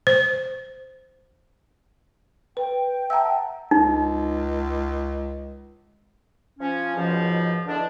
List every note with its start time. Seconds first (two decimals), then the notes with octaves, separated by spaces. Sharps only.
0.07 C5
2.57 B4 G5
3.10 E5 F#5 A5 A#5 E6
3.71 C#2 D#4
6.59 F3 C#4
6.96 C#2 G#2 B2 F3
7.67 E2 D3 G#3 D4